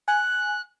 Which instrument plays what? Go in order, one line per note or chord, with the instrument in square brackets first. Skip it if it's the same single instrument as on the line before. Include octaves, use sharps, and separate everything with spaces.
[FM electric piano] G#5 [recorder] F#6